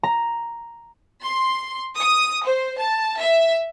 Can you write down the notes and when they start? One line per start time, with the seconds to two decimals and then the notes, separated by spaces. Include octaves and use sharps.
0.03 A#5
1.23 C6
1.97 D#6
2.45 C5
2.79 A5
3.18 E5